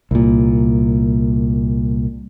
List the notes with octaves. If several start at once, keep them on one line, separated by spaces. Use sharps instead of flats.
C2 A#2